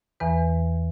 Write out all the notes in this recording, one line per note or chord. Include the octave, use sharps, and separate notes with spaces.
E2 E3 B4